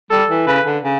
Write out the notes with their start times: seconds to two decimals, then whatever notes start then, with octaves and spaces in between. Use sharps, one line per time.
0.11 G3 A4
0.29 E3
0.47 C#3 B4
0.65 D3
0.83 C#3